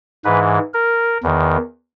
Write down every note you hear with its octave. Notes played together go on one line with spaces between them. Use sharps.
G#2 E3 B4
A#4
E2 D#3